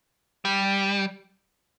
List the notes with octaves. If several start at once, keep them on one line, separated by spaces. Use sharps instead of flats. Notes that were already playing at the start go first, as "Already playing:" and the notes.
G3